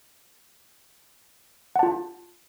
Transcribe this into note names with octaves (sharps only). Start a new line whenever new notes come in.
F4 F#5 A5